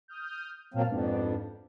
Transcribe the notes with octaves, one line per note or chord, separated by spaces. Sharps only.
D#6 F6 G6
A#2 F#3 A#3 C4 A5 F6
F2 G#2 B3 D4